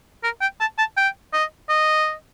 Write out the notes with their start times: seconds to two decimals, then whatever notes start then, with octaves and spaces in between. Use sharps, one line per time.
0.23 A#4
0.41 G5
0.60 A5
0.78 A5
0.97 G5
1.33 D#5
1.69 D#5